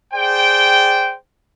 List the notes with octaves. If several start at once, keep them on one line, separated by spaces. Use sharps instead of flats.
G#4 C5 D5 G5